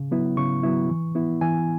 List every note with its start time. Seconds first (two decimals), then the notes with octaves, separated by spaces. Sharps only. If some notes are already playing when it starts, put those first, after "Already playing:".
Already playing: C#3
0.11 F#3 B3 E4
0.37 C#3 C#6
0.63 F#3 B3 E4
0.89 E3
1.15 B3 E4
1.41 E3 G#5